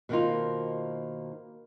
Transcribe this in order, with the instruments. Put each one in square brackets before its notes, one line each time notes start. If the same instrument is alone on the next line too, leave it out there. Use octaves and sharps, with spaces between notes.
[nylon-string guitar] B2 D#3 A#3 C4 D#4 F4